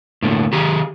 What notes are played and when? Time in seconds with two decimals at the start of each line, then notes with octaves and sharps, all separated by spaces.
0.23 A2 D3 A#3
0.53 D#3 G4 G#4 A#5